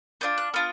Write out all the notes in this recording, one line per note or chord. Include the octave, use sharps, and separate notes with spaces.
B3 D4 F4 G6
F#6
B3 D4 F4 F6